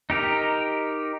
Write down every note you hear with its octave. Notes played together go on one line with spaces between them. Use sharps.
D#4 G4 A#4